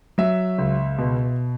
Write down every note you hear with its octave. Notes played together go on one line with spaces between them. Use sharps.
F#3 E5
C#2
B2